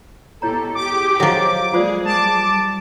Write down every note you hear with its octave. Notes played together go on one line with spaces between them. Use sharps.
B2 E4 G4 A4 C#5 A#5
G4 G#4 D6
F3 F#3 A4 D#5 G5
G#3 A#3 F4 G#4 C5 D5
G3 A5 D6